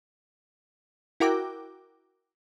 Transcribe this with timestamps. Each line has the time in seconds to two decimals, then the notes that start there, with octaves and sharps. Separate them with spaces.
1.20 E4 F#4 A#4 G5 D6